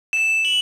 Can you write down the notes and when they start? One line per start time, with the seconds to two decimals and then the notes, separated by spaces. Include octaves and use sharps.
0.13 E7
0.45 F#7